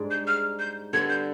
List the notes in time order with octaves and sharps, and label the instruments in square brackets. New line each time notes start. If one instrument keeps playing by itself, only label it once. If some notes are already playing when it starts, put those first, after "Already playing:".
Already playing: [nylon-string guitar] G#2 G3 D4 G#4
[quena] G6
F6
G6
[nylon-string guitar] D3 G3 B3 [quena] G#6
[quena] G6